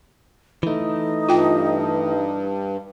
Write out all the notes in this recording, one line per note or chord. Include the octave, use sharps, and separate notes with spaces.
E3 A3 D#4
G2 F4 G5